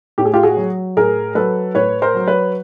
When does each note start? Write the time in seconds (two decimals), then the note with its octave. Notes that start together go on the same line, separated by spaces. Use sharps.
0.18 A2 G4
0.25 G#4
0.34 F4 G4
0.43 F#4 G#4
0.57 F#3
0.97 A2 G#4 A#4
1.35 F#3 A4 B4
1.75 A2 B4 C#5
2.02 A#4 C5
2.15 F#3
2.28 B4 C#5